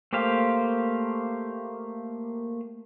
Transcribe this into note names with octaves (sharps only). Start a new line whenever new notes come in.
A3 A#3 G4 C5 F5